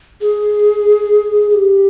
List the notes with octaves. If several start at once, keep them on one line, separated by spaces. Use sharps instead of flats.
G#4
G#4
G4